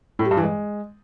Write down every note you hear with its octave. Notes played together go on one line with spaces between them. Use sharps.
A2
G3
G2
E3
G#3